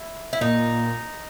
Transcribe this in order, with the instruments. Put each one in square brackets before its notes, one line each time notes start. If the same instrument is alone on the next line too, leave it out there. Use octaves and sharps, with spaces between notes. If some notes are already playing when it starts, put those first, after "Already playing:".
Already playing: [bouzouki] E4
E4
[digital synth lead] A#2 [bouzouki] D#4